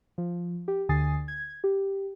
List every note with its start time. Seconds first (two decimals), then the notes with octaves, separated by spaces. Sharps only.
0.18 F3
0.68 G4
0.89 D2 D3 G#5 D#6 A6 C7
1.28 G#6
1.64 G4